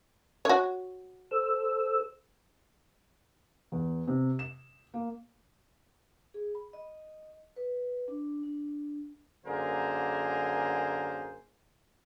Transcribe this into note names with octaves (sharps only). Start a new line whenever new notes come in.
F#4 C#5
A4 C5 E6
E2
C3
E7
A#3
G#4
B5
D#5
B4
D4
D4
F#2 D3 A#3 G#4 A#4 C5